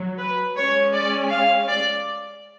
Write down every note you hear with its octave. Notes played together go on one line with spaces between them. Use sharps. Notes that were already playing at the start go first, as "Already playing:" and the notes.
Already playing: F#3
B4
G#3 C#4 C#5
D5
F5
D5